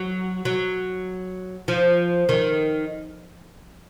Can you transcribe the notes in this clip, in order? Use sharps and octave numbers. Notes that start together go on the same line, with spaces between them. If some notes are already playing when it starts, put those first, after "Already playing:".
Already playing: F#3
F#3
F3
D#3